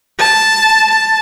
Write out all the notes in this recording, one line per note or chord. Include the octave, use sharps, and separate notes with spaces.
A5
A5